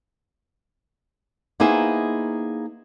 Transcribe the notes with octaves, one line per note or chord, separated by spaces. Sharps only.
A#3 B3 D#4 E4 G#4 C5